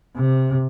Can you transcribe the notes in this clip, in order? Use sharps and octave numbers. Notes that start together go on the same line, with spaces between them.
C3